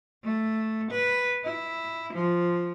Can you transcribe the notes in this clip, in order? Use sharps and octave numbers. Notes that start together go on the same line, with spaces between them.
A3
B4
E4
F3